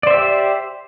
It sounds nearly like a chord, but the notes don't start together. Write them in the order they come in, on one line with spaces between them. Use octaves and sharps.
D5 C5 E5 G4